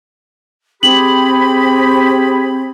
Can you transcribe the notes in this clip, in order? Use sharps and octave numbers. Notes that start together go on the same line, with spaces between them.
C4 G4 G#4 B5 F#7